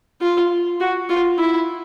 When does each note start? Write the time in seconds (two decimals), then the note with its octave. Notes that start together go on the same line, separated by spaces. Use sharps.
0.21 F4
0.80 F#4
1.09 F4
1.38 E4